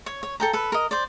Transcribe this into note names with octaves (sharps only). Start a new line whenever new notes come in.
C#5
C#5
A4 G5 A#5
A4 B4
A#4 D#5
C5 D5